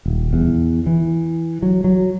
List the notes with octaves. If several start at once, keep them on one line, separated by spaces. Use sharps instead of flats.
D#1
E2
E3
F#3
F#3